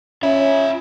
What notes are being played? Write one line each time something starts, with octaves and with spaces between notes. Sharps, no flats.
C#4 F4 E5